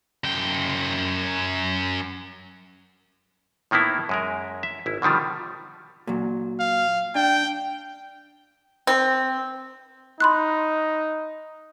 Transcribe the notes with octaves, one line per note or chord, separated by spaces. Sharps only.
F#2 G5
A2 D#3 A#3 B3 E4
F#2 G#3 A#4
E5
G#1 E4
B2 D3 D#3 F3 G3
A#2 F#3
F5
D4 G5
C4
D#4 B5 C6 F#6